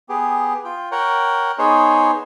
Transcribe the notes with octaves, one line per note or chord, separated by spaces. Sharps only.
B3 G4 G#4
F4 G5
A#4 C#5 F#5 G5
B3 D#4 G#4 C5 C#5